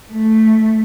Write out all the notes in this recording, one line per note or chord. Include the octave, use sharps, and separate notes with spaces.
A3